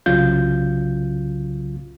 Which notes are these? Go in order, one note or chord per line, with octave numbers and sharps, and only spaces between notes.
C2 C#3 F#3 F4 G6